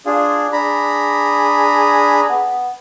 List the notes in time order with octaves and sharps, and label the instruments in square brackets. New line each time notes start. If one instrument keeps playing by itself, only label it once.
[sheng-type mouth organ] D4 G#4 [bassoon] F4
[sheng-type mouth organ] D4 A#5 B5 [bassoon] G#4
[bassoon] B3